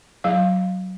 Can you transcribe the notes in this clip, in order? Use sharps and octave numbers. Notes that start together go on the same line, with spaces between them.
F#3 F5